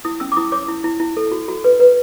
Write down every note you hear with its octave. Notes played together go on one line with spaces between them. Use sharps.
E4 D#6
C#4 E6
D6
E4 D#6
C#5 D6
E4
E4
E4
A4
F#4
F#4
B4
B4